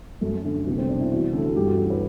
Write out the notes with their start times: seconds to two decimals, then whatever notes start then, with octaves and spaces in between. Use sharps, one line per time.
0.21 F#2 A3
0.44 D3
0.66 C2 B3
0.78 C4
0.89 B2 D4
1.00 E4
1.11 E3 F#4
1.33 D2 A4
1.56 G2 G4
1.68 F#4
1.78 E3 A4
1.90 B4